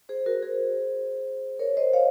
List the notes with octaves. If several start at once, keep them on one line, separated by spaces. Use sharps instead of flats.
G#4 C5
F#4 A#4
G#4 C5
A#4 C#5
C5 D#5
C#5 F5